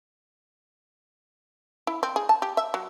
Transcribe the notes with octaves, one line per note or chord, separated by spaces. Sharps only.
E4
C4
G#4
A5
G4
E5
F#3